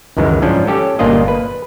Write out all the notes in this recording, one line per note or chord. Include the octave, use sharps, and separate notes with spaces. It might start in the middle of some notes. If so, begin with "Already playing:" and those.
C#2 F#2 D#3 E3 G#3
G#2 F3 C#4 D4
C#4 G4 A4
G1 A#2 A#3 D4 F4 D#5
B4